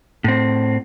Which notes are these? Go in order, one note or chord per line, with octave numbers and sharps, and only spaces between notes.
A2 C4